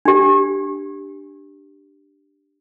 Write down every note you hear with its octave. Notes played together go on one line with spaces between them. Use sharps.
D4 G4